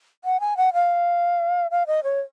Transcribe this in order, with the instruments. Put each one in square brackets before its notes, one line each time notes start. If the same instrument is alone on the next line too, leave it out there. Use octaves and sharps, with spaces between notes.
[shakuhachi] F#5
G#5
F#5
F5
F5
D#5
C#5